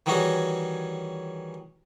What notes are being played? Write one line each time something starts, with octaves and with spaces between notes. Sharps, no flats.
D#3 E3 G3 C#4 F#4 G#4